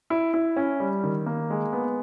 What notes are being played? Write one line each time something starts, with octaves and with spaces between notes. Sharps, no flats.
E4
E4
C#4
G3
D#3
A#3
G#3
B3